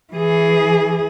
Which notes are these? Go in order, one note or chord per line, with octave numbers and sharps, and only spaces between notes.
E3 G#4